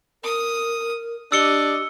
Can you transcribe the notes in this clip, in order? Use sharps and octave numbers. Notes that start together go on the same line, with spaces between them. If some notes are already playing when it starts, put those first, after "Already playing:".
A#4 D#6
D4 G4 D#5 E6 C#7 G7